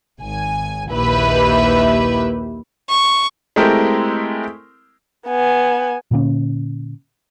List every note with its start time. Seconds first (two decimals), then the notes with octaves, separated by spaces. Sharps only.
0.20 G#1 G#5
0.92 A#1 D#2 E4 G4 B4 E5
2.89 C#6
3.56 G#3 A3 C4 E4 G4 A#4
5.27 B3 G#5
6.11 A#2 D3 A#3 C#4